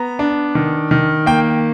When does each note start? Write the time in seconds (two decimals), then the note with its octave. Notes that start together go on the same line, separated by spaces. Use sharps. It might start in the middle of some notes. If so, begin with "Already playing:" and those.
Already playing: B3 A#5
0.19 D4
0.55 D#3
0.91 D#3
1.26 A#3 G5